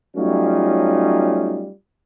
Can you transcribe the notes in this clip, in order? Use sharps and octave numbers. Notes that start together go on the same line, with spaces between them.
F#3 G3 A3 C#4 D#4 F4